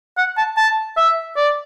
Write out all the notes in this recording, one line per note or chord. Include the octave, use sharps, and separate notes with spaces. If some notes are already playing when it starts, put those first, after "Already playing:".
F#5
A5
A5
E5
D5